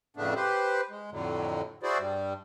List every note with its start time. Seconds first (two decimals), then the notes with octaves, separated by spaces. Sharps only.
0.17 F2 A2 C#3 A3 B3 D4
0.36 G4 B4 C5
0.90 G#3
1.11 F2 A2 D3 F#3
1.83 E4 F#4 G#4 C5 D5
1.98 G2 G3